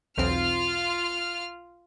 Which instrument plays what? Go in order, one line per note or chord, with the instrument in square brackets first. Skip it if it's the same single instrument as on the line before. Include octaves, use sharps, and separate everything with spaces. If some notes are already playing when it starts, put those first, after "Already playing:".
[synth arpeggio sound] B1 E2 C4 [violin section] F4 F6